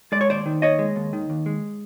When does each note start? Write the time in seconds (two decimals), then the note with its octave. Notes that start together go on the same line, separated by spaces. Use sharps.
0.12 G#3 D5
0.21 C#5
0.29 D#2 C5 D5
0.46 D#3
0.62 D#2 C#5 D#5
0.79 G#3
0.96 D#2
1.13 D#3
1.30 D#2
1.46 G#3